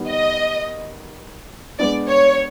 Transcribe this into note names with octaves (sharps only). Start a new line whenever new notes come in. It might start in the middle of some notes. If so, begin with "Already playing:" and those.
Already playing: D#3 G3 B3
D#5
G#3 B3 D4 D5
C#5